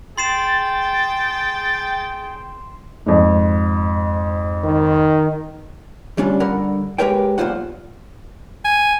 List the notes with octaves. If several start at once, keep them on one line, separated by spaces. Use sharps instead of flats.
G#4 G5 C6 A6 C7 E7
F2 G#2
D#3
D2 G3 C#4 D4 F4
G2 D3 A#4 F#5 B5
G#3 G4 A#4 B4 C#5 G5
B1 G2 A#2 F4 C5 F#5
G#5